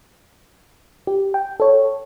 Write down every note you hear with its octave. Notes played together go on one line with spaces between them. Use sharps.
G4
G5
A4 C#5